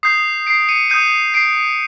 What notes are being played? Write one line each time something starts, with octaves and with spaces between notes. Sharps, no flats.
D#6 G6 C7
C7 D7
C#7 D#7
D#6 G6 C#7 D#7
C7 D7